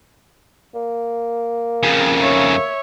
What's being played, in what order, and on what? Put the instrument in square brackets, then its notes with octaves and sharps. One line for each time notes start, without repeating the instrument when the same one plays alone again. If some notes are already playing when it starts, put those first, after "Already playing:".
[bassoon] A#3
[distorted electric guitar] F2 C#3
[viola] C#5 E5